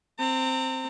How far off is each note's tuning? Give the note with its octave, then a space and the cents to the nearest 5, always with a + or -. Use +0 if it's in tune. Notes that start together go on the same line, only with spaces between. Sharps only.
C4 +0 A#5 -40